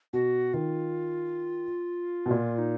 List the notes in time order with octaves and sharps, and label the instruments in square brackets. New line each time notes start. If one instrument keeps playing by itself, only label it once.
[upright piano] B2 [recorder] F#4
[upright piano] D#3 [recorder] F4
[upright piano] B2
A#2
[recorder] D#4